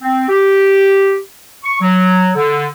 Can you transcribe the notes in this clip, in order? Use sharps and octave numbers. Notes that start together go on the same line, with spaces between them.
C4
G4
C#6
F#3
D3